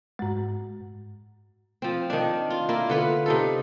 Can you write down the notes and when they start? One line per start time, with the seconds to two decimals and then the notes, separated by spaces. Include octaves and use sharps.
0.19 G#2 G#3
1.82 F3 C4
2.10 D#3 D4
2.50 F4
2.69 A#3 E4 F4
2.90 D3 B3 F4
3.26 C3 D#4 A4